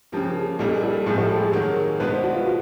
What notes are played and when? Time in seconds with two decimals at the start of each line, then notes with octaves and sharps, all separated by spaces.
0.12 C#3 F3 A#3 G4
0.36 G#4
0.59 A#2 G3 A#3 D#4 A4
0.71 G#4
0.83 A4
1.06 A2 F3 G#3 C4 G#4
1.18 A4
1.29 G4
1.41 G#4
1.53 D#3 F#3 A#3
2.00 B2 G#3 B3 D4 B4
2.11 C5
2.23 F#4
2.35 F4
2.46 F#4